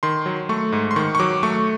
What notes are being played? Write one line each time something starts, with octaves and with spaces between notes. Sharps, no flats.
D#3 C6
F#3
A3 C#6
G#2
C6
D#3 C#6
C#6
F#3 D6
A3 C#6